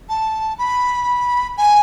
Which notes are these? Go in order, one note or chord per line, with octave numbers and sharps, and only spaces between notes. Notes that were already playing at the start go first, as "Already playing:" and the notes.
A5
B5
G#5